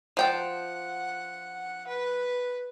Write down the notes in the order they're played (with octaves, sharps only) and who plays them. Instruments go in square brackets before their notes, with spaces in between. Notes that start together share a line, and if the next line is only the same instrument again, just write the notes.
[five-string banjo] F3 G5 A5 [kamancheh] F#5
[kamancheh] B4